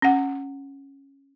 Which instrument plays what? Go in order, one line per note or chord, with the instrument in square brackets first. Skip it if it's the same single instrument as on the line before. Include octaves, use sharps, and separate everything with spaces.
[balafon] C#4 F#5